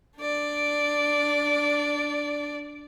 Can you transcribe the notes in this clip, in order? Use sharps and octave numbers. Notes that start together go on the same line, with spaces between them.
D4 D5